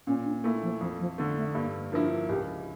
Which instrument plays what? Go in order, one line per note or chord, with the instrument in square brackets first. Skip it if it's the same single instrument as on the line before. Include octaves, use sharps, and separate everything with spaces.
[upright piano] A#2 [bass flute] C#4
[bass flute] D4
[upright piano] A3 E4 [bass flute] A#3
[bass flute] F3
[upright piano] F2 [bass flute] F3
[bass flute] F3
[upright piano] D3 A3
[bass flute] A3
[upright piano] G2 [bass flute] A#3
[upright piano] F3 A#3 E4 [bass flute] D4
[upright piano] C#2 [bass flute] G4